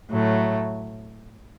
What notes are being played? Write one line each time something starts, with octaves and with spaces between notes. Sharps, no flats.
A2 F#3 A3